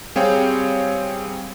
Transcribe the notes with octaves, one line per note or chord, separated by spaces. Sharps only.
G3 C4 G#4 C#5 F5 G5